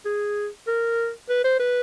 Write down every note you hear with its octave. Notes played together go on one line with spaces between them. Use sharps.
G#4
A#4
B4
C5
B4